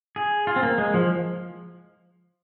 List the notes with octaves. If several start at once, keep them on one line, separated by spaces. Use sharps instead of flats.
G#4
F4
C4
A#3
G#3
F3